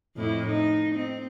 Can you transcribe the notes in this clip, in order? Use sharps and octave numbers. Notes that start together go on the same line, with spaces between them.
F2 A2 E4
D#4
C4